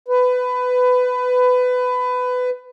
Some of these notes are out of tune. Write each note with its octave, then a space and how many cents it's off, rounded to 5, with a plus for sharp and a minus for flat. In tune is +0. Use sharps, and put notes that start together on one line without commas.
B4 +20